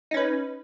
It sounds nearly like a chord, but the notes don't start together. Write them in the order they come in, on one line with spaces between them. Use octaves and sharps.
D#4 C#4 B4